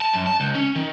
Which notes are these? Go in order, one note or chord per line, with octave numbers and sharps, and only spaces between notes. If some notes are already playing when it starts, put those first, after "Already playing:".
A5
F#2
A5
C#2
C#4
D#3